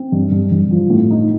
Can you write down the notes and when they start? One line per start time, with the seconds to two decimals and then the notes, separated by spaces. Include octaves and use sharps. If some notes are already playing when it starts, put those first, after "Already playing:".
Already playing: C4
0.12 G2
0.32 G2
0.52 G2
0.71 F3
0.90 A2
1.10 D#4